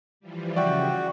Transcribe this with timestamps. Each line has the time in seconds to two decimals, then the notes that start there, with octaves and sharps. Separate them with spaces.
0.20 E3 F3 G3
0.56 C#3 F#4 D5 E5 G5